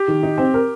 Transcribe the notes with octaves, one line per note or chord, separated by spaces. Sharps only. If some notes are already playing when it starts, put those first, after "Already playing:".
Already playing: G4
D#3
D#4
C4
A#4